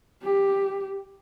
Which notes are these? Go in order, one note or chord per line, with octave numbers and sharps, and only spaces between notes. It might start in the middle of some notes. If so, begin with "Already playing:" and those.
G4